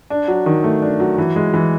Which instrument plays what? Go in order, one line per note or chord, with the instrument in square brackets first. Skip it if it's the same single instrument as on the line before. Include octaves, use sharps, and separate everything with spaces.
[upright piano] D4
F#3
D#3
A3
D4
F#3
E3
G#3
E3